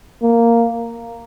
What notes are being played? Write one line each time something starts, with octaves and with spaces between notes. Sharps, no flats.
A#3